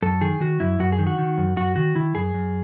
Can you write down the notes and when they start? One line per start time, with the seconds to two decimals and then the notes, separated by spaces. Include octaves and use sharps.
0.02 F#2 A4
0.21 D#3 G#4
0.40 D#3 F#4
0.60 F#2 E4
0.79 F#2 F#4
0.92 G#4
0.99 D#3
1.07 F#4
1.18 D#3
1.38 F#2
1.56 F#2 F#4
1.76 D#3 F#4
1.95 D#3 E4
2.15 F#2 G#4
2.34 F#2